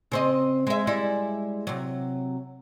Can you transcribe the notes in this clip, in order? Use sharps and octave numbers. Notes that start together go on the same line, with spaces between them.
C#3 C4 D#5
G#3 E5
G3 G#3 E4
C3 F#3